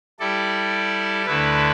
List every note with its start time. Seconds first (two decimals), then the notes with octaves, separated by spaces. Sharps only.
0.19 G3 E4 A4 D5
1.25 D2 D3 A3 E4 B4